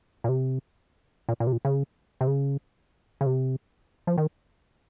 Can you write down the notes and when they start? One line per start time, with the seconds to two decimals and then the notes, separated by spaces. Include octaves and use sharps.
0.24 A#2
0.29 C3
1.29 A#2
1.40 A#2
1.47 C3
1.52 A#2
1.65 C#3
2.21 C3
2.27 C#3
3.21 C#3
3.26 C3
4.07 F3
4.18 D#3